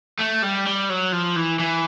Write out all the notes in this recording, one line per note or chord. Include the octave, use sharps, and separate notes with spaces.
A3
G3
G3
F#3
F3
E3
E3